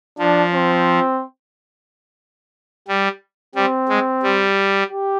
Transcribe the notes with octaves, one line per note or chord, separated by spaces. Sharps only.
F3 D4
C4
G3
G3 C4
G#3
G3
G4